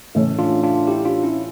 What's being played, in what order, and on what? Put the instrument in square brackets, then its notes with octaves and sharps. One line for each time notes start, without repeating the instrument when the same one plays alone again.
[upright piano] A2 E3 A3 C#4
[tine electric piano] D4 F4
D4 F4
E4 G4
D4 F4
C#4 E4